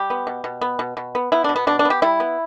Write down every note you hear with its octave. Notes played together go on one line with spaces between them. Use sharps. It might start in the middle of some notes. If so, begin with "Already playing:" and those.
Already playing: G3 G4
B3
B2
B2
B3
B2
B2
B3
B3 E4
B2 D4
B3
B2 D4
D4
B3
G4
G3 E4
B3